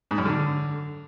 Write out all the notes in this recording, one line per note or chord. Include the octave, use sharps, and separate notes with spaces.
G#2
F#2
D3